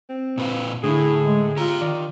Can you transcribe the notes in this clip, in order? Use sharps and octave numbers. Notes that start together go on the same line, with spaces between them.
C4
A#2 B4 F5
A2 D3 E4 G#4
G#3
F4 G4 A#5
D#3 D5